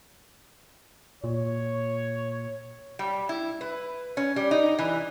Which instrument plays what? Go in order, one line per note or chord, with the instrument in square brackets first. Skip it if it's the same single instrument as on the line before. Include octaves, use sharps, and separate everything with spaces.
[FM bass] A#2 [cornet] C#5
[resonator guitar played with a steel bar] G3
E4
B4
C#4
G3
D#4
E3